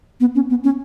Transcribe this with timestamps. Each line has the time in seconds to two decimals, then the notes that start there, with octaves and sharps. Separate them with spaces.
0.20 B3
0.35 C#4
0.50 B3
0.64 C#4